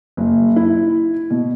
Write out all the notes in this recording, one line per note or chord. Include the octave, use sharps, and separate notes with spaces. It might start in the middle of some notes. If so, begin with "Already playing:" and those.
F#1
E4
B2